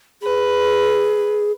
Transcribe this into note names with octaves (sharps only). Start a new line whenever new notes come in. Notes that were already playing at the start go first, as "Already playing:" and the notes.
G#4 B4